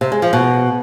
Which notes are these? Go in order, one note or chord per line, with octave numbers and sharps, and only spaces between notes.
C3
G#3
F3
B2